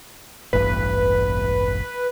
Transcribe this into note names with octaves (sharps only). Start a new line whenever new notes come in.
E1 A1 G2 B4